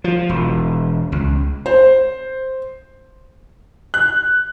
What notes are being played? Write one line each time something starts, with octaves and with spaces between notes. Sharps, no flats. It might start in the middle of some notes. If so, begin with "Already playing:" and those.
F3
E1
C#2
C5
F#6